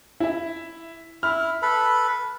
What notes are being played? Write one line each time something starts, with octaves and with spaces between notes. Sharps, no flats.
E4 E5
E4 F6
A4 B4 B5